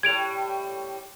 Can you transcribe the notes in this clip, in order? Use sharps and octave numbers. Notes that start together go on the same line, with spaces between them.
A2 G3 G#6 D7 F7